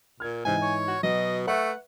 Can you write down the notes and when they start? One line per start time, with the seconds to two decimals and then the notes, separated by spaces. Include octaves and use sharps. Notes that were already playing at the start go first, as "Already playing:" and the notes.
0.20 A#2 F6 G#6
0.45 G#2 C3 E3 D#4 G#5
0.62 C#5
0.88 F#4
1.03 B2 F#3 D#5
1.47 A3 B4 E5 F#5 C#6